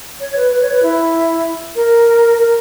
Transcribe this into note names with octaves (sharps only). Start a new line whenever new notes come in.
C#5
B4
B4
C#5
B4
E4
A#4
A#4